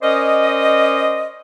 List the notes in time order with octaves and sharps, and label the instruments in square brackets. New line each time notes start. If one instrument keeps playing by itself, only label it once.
[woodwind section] C#4 A#4 C5 D5 D#5